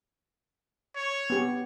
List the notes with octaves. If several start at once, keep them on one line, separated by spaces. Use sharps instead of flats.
C#5
B3 G4